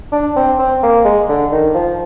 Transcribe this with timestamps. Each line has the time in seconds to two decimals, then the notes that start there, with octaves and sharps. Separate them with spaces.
0.12 D4
0.36 C4
0.59 C4
0.83 A#3
1.05 G#3
1.29 D3
1.52 D#3
1.74 F3